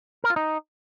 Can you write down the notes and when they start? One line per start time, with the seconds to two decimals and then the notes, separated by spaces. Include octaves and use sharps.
0.24 A#4
0.30 F4
0.36 D#4